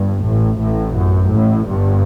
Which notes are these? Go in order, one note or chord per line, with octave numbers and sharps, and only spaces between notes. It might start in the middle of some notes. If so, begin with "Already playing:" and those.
Already playing: G1 G2
A1 A2
A1 A2
F#2
A1 A2
G1 G2